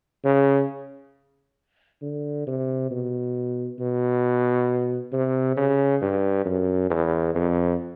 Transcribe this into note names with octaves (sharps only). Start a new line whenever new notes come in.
C#3
D3
C3
B2
B2
C3
C#3
G2
F#2
E2
F2